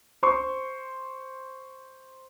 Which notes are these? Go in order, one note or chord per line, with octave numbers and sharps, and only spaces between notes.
C5 C6 C#6